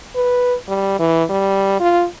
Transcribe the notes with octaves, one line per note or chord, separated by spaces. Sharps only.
B4
G3
E3
G3
F4